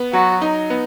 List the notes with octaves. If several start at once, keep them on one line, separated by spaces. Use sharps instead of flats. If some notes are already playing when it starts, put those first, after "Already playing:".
Already playing: B3
F#3 F#4
D#4
B3